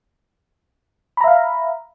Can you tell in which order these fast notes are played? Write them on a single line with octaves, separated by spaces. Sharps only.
B5 A#5 E5 F5